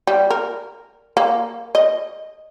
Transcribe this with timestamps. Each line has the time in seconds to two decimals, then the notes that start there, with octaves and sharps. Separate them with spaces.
0.07 G3
0.30 A#4
1.17 A#3
1.75 D#5